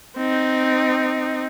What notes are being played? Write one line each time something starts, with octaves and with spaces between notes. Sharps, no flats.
C4 D#4